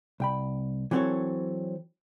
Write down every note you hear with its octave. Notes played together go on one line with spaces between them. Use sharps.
C2 G5 B5
E3 F#3 C4 F#4 A4 C#5